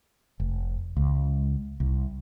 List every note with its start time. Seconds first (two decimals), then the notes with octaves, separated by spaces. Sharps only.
0.40 F1
0.97 C#2
1.80 C2